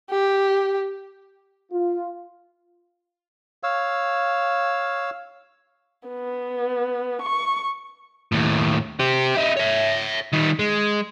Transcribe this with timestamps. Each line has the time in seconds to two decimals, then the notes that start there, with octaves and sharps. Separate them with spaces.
0.10 G4
1.72 F4
3.63 C#5 F5 E6
6.08 B3
7.22 C#6
8.32 D#2 A2
9.00 G4 C5
9.36 D#4 E4
9.57 C#5 E5
10.32 D#3 G3
10.59 G#3